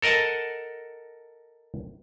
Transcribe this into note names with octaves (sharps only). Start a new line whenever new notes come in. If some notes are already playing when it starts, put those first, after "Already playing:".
A4 A#4 D#5 F#5 A5